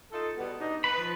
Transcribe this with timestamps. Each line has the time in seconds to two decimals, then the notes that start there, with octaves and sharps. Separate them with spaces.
0.12 D#4 F4 A4
0.37 B2 G3 B3
0.59 D4 D#4
0.84 B4 B5
0.97 F3